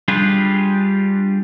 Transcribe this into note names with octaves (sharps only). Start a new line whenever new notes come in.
G3 D4 F4 G4 G#4